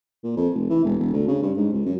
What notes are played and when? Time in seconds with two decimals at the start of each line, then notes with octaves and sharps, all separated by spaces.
0.24 A#2
0.36 F2
0.54 F1
0.69 E3
0.84 E1
0.98 E1
1.13 D2
1.28 C#3
1.42 G2
1.57 G#2
1.73 C#2
1.85 F#2